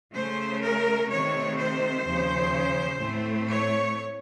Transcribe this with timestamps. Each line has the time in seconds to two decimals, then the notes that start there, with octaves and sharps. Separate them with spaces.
0.13 C#3 A3 C#4 C5
0.61 A#4
1.09 C3 D#3 A3 C4 C#5
1.57 C5
2.04 D#2 C#3 F3
3.00 A2 A3 C4
3.48 C#5